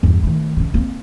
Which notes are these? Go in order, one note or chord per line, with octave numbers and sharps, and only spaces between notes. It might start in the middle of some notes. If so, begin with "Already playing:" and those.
E2 G2
D#3 A3
C#3 C#4
A#3 C4